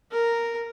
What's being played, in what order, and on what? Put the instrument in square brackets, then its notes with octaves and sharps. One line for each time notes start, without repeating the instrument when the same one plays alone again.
[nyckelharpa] A#4